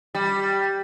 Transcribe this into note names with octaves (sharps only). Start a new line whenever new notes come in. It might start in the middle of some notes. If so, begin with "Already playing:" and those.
G3